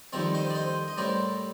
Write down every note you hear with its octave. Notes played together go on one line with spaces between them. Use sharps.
F2 D#3 G3 C4 A#4 D5
C5 D#5
D5
C5 D#5
D#5
A2 G3 C4 A#4 D5